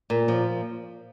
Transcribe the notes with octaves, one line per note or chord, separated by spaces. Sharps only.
A#2
F3